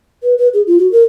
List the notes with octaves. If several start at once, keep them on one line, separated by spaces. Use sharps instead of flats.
B4
B4
G#4
F4
F#4
A#4